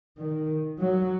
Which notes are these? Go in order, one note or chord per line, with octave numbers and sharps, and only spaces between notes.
D#3
F#3